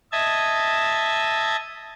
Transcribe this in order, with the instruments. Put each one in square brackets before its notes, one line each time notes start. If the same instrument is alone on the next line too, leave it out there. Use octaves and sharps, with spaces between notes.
[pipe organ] D#5 E5 A5 G#6